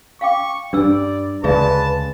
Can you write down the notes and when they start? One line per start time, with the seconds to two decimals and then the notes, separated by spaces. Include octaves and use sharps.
0.21 F5 G5 C#6 D6
0.73 G2 G3 D4 B4 D5 E6
1.44 D2 C#3 G#3 G#4 B4 D5 E5 A5